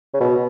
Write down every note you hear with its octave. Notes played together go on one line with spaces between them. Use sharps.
C#3
B2